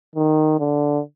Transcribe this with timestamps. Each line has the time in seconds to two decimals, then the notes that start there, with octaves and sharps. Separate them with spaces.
0.15 D#3
0.60 D3